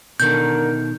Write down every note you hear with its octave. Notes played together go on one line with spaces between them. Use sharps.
B2 D3 D#3 A#4 G6